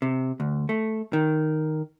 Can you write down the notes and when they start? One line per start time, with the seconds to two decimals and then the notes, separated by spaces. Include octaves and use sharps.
0.02 C3
0.40 D2
0.69 A3
1.13 D#3